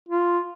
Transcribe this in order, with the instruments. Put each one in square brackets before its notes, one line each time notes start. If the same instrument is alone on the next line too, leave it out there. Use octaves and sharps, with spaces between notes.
[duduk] F4